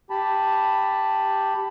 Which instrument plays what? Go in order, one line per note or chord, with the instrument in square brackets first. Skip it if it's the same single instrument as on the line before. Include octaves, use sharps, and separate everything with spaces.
[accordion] G4 A5 B5